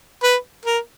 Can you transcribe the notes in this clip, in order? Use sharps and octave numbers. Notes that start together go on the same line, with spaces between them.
B4
A#4